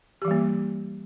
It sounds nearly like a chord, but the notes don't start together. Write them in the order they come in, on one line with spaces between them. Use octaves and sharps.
G4 E3 G3 A#3